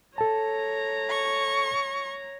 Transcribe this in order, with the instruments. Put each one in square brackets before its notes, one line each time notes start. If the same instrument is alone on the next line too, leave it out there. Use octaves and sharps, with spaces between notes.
[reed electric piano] A4 A5 [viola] C#5 A#5
[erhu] C#6